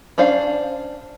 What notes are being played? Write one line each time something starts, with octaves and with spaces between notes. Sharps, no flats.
C#4 D4 C5 F5